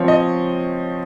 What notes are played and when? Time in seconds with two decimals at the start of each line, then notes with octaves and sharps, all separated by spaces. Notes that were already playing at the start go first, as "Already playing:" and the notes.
Already playing: F3 C4 C#5
0.08 D#5